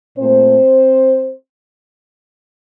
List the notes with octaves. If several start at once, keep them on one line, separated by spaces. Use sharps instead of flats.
A#2 A3 C4 C5